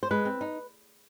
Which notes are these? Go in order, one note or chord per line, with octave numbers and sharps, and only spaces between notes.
C5
G#3 B4
C4
D#4